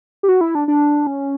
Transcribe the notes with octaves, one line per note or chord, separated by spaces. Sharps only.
G4
F#4
E4
D4
D4
C#4